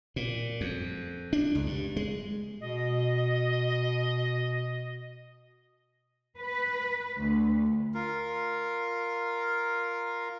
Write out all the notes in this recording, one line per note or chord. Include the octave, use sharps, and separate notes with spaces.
A#2
F2
D4
C#2
G2
G#3
B2 D#5
B4
D2
F4 A#4